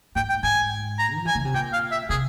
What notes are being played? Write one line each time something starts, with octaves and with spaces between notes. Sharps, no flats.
G#2 G5
G5
G#2 G#5
A#5
F3
E3 G#5
C#3
C3
A#2 G5
F5
E5
C3 G#4